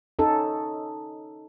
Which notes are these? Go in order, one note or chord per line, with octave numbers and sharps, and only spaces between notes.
C#4 D#4 A4